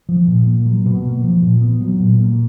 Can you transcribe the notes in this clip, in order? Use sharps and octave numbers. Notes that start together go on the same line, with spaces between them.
F3
A#2
A#3
F#3
B2
A#3
F3
A#2
B3
F#3
A#2
A#3